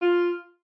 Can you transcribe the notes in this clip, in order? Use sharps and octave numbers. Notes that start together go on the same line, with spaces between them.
F4